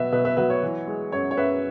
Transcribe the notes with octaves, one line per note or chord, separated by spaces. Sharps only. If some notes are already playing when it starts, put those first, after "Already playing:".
Already playing: B2 F#3 B4 E5
B2 B4 E5
B4 E5
F#3 B4 E5
C#5
E3
G#3
F#2 C#5
C#5
F#2 B4 E5